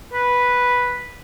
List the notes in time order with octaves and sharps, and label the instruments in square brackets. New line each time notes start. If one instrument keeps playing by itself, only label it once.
[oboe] B4